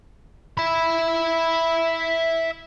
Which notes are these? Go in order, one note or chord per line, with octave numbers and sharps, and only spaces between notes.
E5 B5